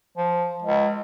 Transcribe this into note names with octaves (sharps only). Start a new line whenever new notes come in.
F3
C#2